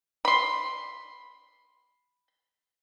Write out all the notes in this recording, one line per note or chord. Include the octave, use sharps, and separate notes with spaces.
B5 C6